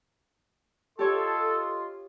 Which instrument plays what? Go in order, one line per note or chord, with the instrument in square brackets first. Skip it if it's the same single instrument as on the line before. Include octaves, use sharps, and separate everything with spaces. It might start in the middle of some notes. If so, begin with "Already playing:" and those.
[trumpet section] F4 D#5 C6 [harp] G4 C#5 G#5 [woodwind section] A4